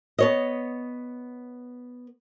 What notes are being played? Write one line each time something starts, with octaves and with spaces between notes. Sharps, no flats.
B3 C#5 D#5